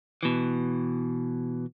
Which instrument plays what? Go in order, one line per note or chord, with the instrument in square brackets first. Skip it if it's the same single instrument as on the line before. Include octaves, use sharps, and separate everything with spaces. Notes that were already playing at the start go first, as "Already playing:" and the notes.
[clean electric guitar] B2 E3